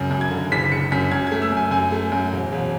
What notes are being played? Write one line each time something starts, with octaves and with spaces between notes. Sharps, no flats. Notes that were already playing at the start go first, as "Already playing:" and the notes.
Already playing: C#2 F#2
F#2
G#6
D3
F#1 B6
F#1 C#7
F#2 B6
F#2 G#6
G#6
A3
E6
F#2 G#5
F#2 G#5
A3
F#2
E1
E1